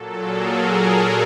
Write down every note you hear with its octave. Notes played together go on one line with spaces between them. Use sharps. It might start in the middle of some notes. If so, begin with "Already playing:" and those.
Already playing: A#2 F#3 A4
G#4 A#4